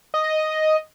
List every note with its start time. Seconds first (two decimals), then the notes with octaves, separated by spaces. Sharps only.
0.14 D#5